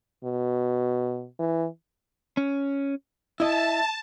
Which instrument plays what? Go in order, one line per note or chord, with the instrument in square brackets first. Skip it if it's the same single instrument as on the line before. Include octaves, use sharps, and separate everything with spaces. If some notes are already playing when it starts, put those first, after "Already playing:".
[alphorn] B2
E3
[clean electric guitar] C#4
[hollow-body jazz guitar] E4 D#5 [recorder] E5 [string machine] A5